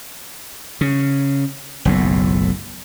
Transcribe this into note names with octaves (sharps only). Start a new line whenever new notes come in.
C#3
F#1 B1 A2